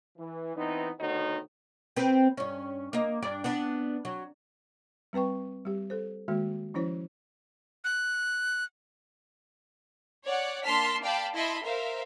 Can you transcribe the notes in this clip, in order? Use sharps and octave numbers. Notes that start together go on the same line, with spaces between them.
E3
E3 B3 C4 D#4
D2 B2 D#3 D#4 F#4 C#5
C4 B4
G2 C#4
A#3 D#5
G2 D4 D5
B3 D4
F#3
G3 C4 B4 G5 C#6
G3 G4
A4 C5
D#3 G#3 A#3 F#4
F3 C#4 E4 C5 C#5
F#6
C#5 D5 F#5
A#3 D4 A5 C6 F6 B6
D5 F5 G5 A5 B5
E4 D#5 E5 A5 B5 C6
A#4 C5 E5 F5